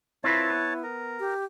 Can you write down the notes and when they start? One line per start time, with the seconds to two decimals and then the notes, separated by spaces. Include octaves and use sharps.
0.24 C4 E4 F4 B4 C#5 A5
0.50 B3
0.84 A#4
1.20 G4